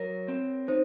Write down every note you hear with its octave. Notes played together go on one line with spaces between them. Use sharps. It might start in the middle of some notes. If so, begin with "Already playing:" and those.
Already playing: F#3 A#4 C#5
C4
D#4 C5